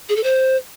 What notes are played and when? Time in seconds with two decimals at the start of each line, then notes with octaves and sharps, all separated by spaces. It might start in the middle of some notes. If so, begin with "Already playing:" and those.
0.09 G#4
0.17 A4
0.24 C5